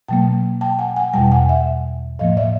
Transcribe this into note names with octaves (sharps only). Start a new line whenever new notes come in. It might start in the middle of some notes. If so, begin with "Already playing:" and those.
B2 F#3 A#3 G5 A5
G5 A5
F#5 G#5
F#5 G#5
E2 B2 G3 G5 A5
F#5 G#5
E5 F#5
A2 F3 A#3 D#5 F5
D5 E5